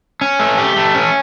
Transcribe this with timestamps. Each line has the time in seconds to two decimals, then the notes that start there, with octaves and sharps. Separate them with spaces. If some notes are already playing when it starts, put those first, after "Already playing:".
0.21 C#4
0.39 A3
0.58 G4
0.76 A3
0.95 C#4